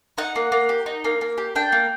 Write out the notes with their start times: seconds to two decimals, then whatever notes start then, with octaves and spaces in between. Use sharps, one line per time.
0.18 D#4 F#5
0.36 A#3
0.52 A#3
0.69 G4
0.86 D#4
1.04 A#3
1.21 A#3
1.38 G4
1.55 D4 G5
1.72 A#3